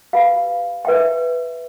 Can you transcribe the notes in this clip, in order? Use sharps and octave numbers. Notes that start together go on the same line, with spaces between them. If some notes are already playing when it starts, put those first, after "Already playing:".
G4 B4 F5 B5
B4 E5 G5 C6